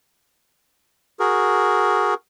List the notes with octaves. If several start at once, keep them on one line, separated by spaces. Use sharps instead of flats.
F#4 G#4 A#4